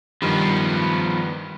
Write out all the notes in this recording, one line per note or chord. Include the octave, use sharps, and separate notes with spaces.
G2 D#3 F3 B3